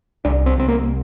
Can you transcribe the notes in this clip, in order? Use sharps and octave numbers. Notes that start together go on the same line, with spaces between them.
C2 D4
C4
C2 C4
A#3